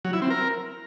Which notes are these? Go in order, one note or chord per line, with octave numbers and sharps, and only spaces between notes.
F#3
E4
C4
A#4